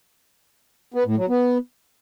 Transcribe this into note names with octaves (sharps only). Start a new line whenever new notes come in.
B3
A2
F#3
B3